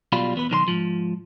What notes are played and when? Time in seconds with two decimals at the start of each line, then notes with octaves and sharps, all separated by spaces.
0.12 B1 B2 G3 F4 B5
0.35 E2 B3 B4
0.50 B1 D#3 A#4 C6
0.68 G#2 F3